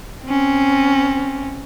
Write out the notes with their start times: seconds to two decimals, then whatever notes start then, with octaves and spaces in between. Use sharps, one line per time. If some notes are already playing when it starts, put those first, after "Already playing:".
0.25 C4 C#4